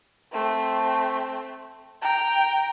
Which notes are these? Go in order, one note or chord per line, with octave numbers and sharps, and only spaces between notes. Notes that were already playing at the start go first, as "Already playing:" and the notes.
A3 C4
G5 A#5